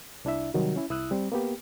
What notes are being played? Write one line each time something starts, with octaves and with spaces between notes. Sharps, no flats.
C2 D4 E4 E5
C3 D#3 F#3 G3 F#4
C#4 E4
C2 E4 D#6 E6 F#6
G3 C4
A#3 B3 G4